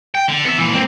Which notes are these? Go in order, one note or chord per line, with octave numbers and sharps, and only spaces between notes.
G5
D3
B3 E5
A#2 E3
A#3 C4